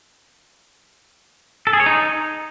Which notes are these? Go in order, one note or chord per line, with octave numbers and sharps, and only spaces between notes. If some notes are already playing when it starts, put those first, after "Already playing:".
A4
G#4
C#5
D#4